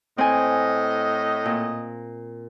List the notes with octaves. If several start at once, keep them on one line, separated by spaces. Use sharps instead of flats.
A2 C4 D#5 G#5
A#2